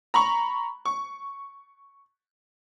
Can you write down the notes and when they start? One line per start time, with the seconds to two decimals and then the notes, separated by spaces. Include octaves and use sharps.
0.14 A#5 B5 C#6
0.85 C#6